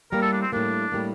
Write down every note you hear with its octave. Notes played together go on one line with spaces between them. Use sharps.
A2 G3 A#3 A#4
A4
D4
C4
A2 G3 A#3 D4
A2 G3 A#3